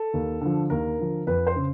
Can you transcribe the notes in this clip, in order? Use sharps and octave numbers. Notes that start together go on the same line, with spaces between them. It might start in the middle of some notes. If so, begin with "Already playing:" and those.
Already playing: A4
D#2
D3 F3
D#2 A#4
D3 F3
F2 B4
C5
C#3